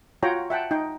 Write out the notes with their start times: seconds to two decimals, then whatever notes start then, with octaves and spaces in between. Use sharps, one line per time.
0.23 F4 F#4 C#5 G5 A#5
0.50 E5 F#5 G5 A5
0.71 D#4 G5